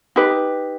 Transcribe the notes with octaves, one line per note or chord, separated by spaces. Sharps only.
D#4 G4 B4